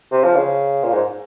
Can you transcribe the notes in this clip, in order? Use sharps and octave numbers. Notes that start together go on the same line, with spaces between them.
C3
F3
C#3
A#2
G#2